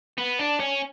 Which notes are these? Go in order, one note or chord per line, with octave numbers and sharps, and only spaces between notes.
B3
D4
C#4